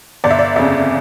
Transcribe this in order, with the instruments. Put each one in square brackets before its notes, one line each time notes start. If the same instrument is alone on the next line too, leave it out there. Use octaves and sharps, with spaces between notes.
[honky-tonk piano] G1 D5
E5
D5
F2 C#3 E5